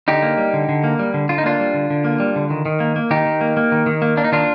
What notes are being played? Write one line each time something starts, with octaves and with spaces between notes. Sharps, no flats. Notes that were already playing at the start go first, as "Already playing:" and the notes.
D3 D#4 G4
A#3
G3
D3
D3
A#3
G3
D3
D3 F4
D#4
A#3 D4 F4
G3
D3
D3
A#3
G3
D3
D#3
D#3
A#3
A#3
D#3 D#4 G4
D#3
A#3
A#3
D#3
D#3
A#3
A#3 D4
D#4
D#3 D4 F4